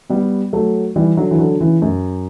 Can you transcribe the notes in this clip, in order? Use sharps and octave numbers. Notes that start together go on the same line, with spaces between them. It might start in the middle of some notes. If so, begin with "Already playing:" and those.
G3 B3
F#3 A3
E3 G3
D3 F#3
E3
D3 F#3
C#3 E3
F#2